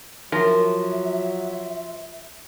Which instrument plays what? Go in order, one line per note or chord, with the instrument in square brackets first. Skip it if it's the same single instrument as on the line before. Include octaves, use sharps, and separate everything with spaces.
[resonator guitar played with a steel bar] F3 [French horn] F#3 [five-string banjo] A#4 [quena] E5